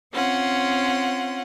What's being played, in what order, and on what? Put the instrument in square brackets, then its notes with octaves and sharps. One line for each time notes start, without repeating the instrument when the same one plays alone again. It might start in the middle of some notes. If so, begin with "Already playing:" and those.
[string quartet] C4 C#4 F4 F#5